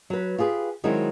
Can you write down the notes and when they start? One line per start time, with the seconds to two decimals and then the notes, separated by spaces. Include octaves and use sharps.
0.10 F#3 B4
0.38 F4 G4 G#4 B4
0.84 D#3 F#3 G#3 C4 D#4 E4